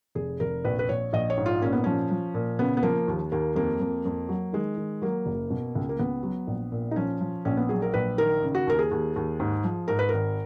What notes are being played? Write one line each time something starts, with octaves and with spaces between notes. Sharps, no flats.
F1 G#4
F1 A#4
A#1 B4
B4
A#1 C#5
A#1 D#5
C#5
G#2
F4
A#2 C#4
B3
F3 C#4
F3
A#2
C#3 B3
B3
F3 A#3
D#2
D#2 A#3
F2 A#3
F2
F2
F#3
D#3 G#3
D#3
F#3 A#3
F#1
B2
C#2
A#3
C#2 B3
F#3
A#1
A#2
D#4
F3 C#4
F3
A#1 C#4
B3
F#3 G#4
A#4
A#1 B4
D#3 A#4
C#3
F#4
D#2 A#4
G#4
D#2
D#2
G#2
F3
G#2 A#4
B4
G#1 A#4